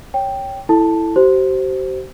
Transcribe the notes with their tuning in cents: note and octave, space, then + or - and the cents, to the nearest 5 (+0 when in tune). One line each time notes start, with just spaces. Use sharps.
C#5 +0 G5 +0
E4 +0 A4 +0 A5 +0
G4 -45 C5 +0